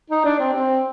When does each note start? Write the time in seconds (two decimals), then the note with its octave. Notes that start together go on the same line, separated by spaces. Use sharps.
0.10 D#4
0.25 D4
0.39 C4
0.53 C4